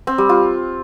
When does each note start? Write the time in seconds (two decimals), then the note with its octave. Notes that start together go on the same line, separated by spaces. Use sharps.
0.07 C4
0.18 G3
0.29 F4